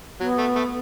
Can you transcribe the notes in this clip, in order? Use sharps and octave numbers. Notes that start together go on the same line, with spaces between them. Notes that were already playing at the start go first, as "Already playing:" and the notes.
F#3 B3
A3
A3